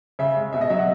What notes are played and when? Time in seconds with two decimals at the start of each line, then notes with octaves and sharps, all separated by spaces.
0.19 C#3 E5
0.36 G#3
0.53 B2 E5
0.61 D#5
0.70 F#3 E5
0.79 F#5